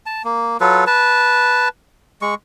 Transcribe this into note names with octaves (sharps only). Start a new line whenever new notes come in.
A5
A#3
F#3 F4 A4 B4
B4 A5
G#3 C#6